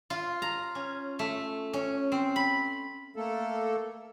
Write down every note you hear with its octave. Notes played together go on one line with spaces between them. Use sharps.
F4
A#5
C#4
A3
C#4
C4
B5
A3 A#3 A4